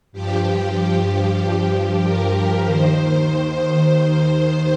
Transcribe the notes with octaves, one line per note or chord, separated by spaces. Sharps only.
G2 F3 G4
A#4
D#2 D#3 C5